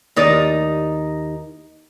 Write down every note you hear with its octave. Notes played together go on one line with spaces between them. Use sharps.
D#2 D#4 D5